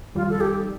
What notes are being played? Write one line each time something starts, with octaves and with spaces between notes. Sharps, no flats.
F2 D#3 G3 F4
A4
G4